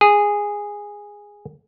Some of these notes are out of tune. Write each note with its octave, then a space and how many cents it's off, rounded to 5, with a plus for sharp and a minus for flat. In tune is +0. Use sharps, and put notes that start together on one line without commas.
G#4 -10